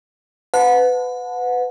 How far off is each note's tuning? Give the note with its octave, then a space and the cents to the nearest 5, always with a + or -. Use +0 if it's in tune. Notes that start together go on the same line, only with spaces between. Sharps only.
B4 +25 F#5 -30 A5 +0